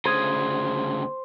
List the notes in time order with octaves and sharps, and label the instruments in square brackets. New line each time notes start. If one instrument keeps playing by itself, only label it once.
[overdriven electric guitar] D2 C#3 [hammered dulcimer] C5 [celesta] D#6 G#6 D#7